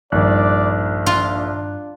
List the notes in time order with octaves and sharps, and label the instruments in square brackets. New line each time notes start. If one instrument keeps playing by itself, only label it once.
[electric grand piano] A#1 D#3 [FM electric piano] G2 F#6 [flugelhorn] D5
[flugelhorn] D4 [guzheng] F4